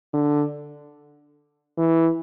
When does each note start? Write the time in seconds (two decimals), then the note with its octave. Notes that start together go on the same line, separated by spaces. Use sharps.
0.13 D3
1.78 E3